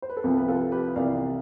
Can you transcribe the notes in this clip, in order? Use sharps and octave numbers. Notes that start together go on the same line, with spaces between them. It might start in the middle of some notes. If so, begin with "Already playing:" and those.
C5
B4
A4
C2 C3 F3 G4
B4
F4 A4
G4 B4
C2 C3 E3 D5 F5